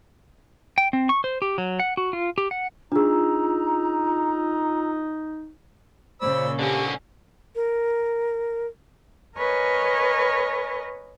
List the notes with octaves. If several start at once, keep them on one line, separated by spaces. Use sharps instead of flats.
G5
C4
C#6
C5
G4
F#3
F#5
F#4
F4
G4
F#5
D4 D#4 F4 G#4 A#5 E6
A#2 C#3 C5 D5 B5 E6
D3 A#3 C4 C#4 G4
A#4
A#4 B4 C#5 D#5 G#5